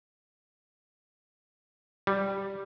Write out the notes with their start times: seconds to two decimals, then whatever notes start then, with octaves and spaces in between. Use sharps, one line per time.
2.07 G3